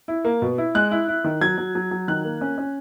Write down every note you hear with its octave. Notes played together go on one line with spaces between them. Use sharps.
E4
A#3
B2
E4
G#3 F#6
E4
E4
D#3
F#3 G#6
F#3
F#3
F#3
D#3 F#6
A#3
C#4
C#4